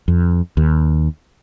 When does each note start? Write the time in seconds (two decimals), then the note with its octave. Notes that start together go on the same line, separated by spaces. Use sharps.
0.08 F2
0.57 D#2